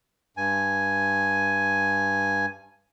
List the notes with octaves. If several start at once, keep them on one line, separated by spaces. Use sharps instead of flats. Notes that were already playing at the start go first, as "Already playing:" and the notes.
G2 G#5